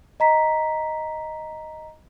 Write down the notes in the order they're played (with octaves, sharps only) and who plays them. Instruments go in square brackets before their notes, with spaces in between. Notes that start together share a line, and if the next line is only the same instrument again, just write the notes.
[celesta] D#5 A#5 B6